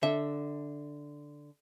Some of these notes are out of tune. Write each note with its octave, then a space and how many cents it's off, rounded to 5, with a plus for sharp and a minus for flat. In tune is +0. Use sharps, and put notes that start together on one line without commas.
D3 +0 E5 -20